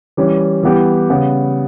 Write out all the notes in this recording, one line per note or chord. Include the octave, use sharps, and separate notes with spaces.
E3 G3 C#4
E3 G3 B3 G4
C#3 G3 B3